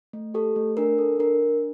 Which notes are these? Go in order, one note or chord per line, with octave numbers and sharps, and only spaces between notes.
A3
G4 A4
A3
D4 A#4
A4
D4 A#4
D4